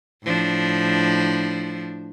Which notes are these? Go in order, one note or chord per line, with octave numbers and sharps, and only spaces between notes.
A2 F3 D4